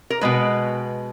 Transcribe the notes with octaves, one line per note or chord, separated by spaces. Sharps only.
A#4
B2 G#3 B4